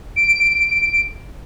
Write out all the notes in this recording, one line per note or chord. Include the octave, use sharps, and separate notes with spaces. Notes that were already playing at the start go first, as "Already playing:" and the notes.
D7